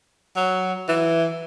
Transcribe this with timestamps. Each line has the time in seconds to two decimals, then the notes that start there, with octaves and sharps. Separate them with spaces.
0.36 F#3
0.88 E3